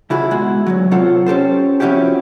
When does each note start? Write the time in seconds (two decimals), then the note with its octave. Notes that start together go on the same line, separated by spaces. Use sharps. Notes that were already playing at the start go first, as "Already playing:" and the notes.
0.10 C#3 E4 F#4 G#4
0.31 B2 G#3 F#4
0.67 D2 B2 F#3
0.91 C3 F#3 C4 F4 A4 F#5
1.26 C#4 G4 A4 C5
1.80 F3 C4 C#4 E4 F#4 G4